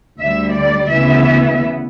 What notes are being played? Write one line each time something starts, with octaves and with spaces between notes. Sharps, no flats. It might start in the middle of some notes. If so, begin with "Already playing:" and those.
D2 D3 G3 E5
D5
D2 C#3 E3 B3 E5